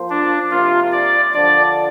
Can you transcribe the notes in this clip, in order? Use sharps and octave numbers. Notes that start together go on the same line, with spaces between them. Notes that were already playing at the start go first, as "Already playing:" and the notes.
Already playing: F3 A#3 F4 C5
D4
C3 F3 A#3 F4
D5
D3 F3 D4 D5